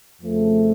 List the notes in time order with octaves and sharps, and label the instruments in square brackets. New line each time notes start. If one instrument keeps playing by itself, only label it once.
[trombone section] F2 C#3 F3 A3